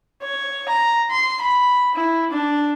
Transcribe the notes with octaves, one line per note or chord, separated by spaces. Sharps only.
C#5
A#5
C6
B5
E4
D4